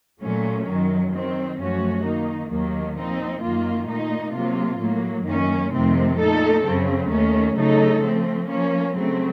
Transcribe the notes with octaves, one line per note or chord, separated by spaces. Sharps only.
A#2 F#3 A3 C#4
F#2 D#3 F#3
D#3 F#3 C4
F#2 F3 A3 C#4 F#4
D#3 A#3 D#4
D#2 D#3 F#3 A#3
A#2 F3 C4 D#4
F#2 D#3 A#3 F4
A#2 A3 D#4
C3 F#3 A#3 F4
A2 F#3 A#3
F#2 D#3 A#3 C#4
F2 C3 D#3 A3 C4
A#2 A3 D#4 A4
F#2 C#3 F#3 C4
D#2 D#3 A3 C#4
C#3 F#3 A3 D#4 A4
F3 A3 C4
F3 A#3 C#4
C#3 F#3 A3 C4